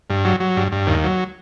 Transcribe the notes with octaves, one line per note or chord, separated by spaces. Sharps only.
G2
F#3
F#3
G2
G2
D#2
F#3